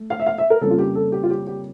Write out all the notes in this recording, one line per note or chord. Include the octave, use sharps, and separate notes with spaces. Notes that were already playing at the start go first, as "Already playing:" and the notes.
Already playing: A3
F5
E5
F5
E5
A#4
F2 C#3 G3 A#3 C#4 A4
F4
G4
A4
G4
F4
G4
G4